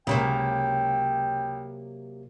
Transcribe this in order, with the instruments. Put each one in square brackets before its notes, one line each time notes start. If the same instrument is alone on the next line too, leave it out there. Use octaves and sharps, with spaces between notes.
[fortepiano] C#2 [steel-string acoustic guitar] C3 F#3 A#3 [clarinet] G5